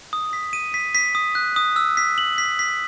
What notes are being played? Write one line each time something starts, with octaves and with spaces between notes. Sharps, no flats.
D#6
B6
D#7
B6
B6
D#6
F#6
D#6
E6
B6
F#7
B6
B6